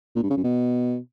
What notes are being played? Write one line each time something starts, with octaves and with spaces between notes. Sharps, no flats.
A#2
G2
C#3
F#2
B2